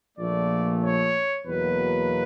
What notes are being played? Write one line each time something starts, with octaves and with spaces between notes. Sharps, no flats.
A#1 A#2 F3 A3 D5
C#5
E2 B2 F#3 A#3 B4